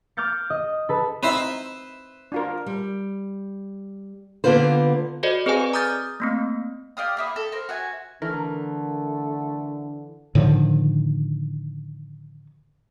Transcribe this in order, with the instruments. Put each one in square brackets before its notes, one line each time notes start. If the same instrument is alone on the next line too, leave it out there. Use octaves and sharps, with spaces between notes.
[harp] D6 F6 G6 A6 C#7
D#5
A4 B4
[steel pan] C4 D#4 E4 [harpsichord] B4 C5 E5
[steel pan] D4 F4 A#4
[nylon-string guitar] G3
D3 A#3 B3 F4 B4 C5
[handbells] F#4 A4 C5 D5 D#5
C4 G#4 B4 D5 G#5
A#5 D6 D#6 F6 G6 A6
A3 A#3 C4
[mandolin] G4 D5 F5 D#6
A#3 E4 D#6
A4
A#4 C5
F#4 E5 G#5
[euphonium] D3 [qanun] E3 [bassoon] A3 [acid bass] A#4
[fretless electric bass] A2 D3 D#3 F3